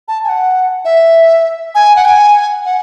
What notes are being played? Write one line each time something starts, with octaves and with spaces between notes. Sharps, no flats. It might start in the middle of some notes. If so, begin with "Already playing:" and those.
A5
G#5
F#5
E5
G#5
F#5
G#5
F#5